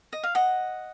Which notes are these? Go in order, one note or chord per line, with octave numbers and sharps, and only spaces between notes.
D#5
F5
D#5 F#5